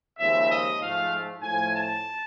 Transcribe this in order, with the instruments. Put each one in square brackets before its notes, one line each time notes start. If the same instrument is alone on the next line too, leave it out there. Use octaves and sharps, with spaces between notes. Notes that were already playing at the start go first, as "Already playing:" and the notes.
[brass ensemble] D#2 C#3 F3 G#3 C4 E5
D#5
G#2 F3 A3 F5
A2 F3 A3 G#5
A5